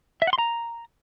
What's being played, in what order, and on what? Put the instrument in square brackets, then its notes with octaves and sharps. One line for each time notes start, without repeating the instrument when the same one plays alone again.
[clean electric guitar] E5
F#5
C6
A#5